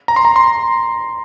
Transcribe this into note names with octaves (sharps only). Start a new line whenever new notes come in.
A#5
C6
A#5
C6